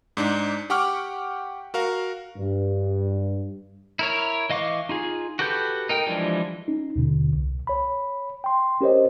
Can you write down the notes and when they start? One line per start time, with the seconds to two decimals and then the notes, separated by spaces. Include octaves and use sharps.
0.17 G#2 D4 D#4
0.70 G4 F#5 G5 C#6 D6 F6
1.74 F#4 A#4 F5
2.36 G2
3.99 E4 A#4 C#5
4.50 E3 D#5 F5 C#6 D6
4.89 D#4 F4 G#4
5.39 F#4 G4 A4 B4 G6
5.89 D#4 A#4 G5
6.07 E3 F3 G3 G#3 D4
6.68 C#4 D#4
6.96 D#2 B2 D3
7.33 C2
7.67 C#5 B5
8.44 G5 C6
8.81 C#4 G4 A#4 C5 C#5 D#5